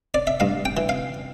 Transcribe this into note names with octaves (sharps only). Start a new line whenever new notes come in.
D5
E5
G2 F5
G5
E3
F5